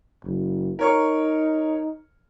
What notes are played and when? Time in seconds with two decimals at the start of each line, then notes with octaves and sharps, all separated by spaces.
0.23 F#1
0.79 D#4 A#4 C#5 C#6